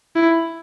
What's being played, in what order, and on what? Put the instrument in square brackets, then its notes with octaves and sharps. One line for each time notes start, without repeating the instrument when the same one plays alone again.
[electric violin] E4